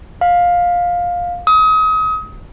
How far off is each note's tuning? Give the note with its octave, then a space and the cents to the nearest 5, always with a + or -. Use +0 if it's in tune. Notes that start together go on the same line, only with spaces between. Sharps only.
F5 +15
D#6 +35